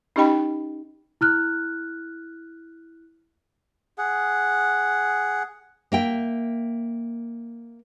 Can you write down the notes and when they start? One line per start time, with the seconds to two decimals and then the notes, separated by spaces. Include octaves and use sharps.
0.16 C#4 D#4 G4 D#5 G5 B5
1.21 E4 F6 F#6
3.98 G#4 F#5
5.92 A#3 E5 G5